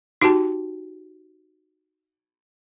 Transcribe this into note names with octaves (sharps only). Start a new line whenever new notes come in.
D#4 F#4 G4 G5 A5